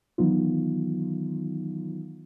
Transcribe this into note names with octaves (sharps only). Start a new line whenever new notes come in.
D#3 E3 F#3 B3 D#4 F4